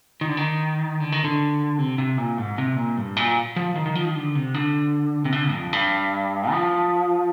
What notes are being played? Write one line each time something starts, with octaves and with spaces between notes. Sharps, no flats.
D#3
D3
D#3
D3
D#3
D3
C3
C3
A#2
G#2
C3
A#2
G2
A#2
F3
D#3
D#3
F3
D#3
D3
C3
D3
C3
D3
F2
G2
F3